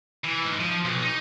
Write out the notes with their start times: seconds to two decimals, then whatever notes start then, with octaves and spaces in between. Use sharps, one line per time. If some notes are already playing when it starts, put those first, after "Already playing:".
0.25 E3
0.45 G#2
0.60 F3
0.85 B1
1.03 D#4